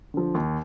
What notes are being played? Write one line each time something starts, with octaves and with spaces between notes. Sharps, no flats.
D3 F3
D#2